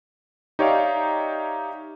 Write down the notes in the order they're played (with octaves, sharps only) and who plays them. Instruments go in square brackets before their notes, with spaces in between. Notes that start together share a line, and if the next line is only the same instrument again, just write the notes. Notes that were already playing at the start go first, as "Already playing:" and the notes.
[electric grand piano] D#4 G4 C#5 D5 E5 F5